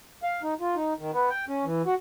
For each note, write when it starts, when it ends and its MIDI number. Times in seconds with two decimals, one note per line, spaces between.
0.23 0.42 77
0.43 0.54 63
0.60 0.75 65
0.76 0.93 63
0.99 1.11 51
1.13 1.29 59
1.30 1.45 79
1.48 1.65 61
1.65 1.82 52
1.86 1.94 66